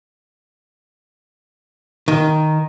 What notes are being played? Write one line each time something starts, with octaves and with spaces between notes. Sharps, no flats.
D#3